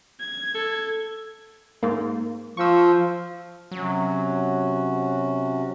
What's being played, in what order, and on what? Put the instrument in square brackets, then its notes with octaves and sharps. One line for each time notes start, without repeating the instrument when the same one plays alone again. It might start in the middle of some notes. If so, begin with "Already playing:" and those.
[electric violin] G#6
[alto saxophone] A4
[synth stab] G#2 A#3
[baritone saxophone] F3 [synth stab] C#6 E6
[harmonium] C3 C#4 F#4 [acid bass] F#3